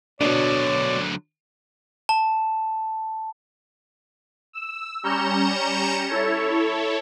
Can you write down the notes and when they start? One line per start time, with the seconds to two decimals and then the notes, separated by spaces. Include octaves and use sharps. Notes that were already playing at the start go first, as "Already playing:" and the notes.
0.21 B2 D3 F#3 D4 C#5 D5
2.09 A5
4.53 E6
5.03 G3 C#4 A#5 G6 C#7 E7
6.09 E4 A4 C#5